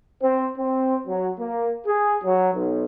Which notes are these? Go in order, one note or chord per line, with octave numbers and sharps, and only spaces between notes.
C4
C4
F#3
A#3
G#4
F#3
B1